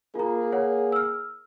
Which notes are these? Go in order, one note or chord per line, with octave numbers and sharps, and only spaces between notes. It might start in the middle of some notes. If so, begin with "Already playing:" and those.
A#3 F4 G#4 A#5
C#5 F#5
E6 F6